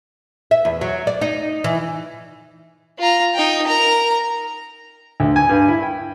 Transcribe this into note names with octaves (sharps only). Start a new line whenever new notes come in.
E5
E2
F#3
D5
D#4
E3
F4 A#5
D#4 G5
A#4 A#5
D2
G#5
G2
E4
G5